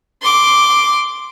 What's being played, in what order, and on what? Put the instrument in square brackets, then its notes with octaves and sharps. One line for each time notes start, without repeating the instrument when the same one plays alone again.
[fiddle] C6 D6